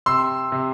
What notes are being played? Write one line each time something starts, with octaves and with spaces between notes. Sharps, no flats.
C3 C6 E6
C3